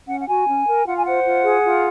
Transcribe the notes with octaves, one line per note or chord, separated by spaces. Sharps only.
C#4 F#5
F#5
F#4 G#5
C#4
A#4
F4 F#5
G#5
C5 F#5
F4
G#4
F4